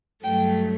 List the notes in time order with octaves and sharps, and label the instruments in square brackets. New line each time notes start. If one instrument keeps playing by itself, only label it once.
[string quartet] G2 F#3 A3 G5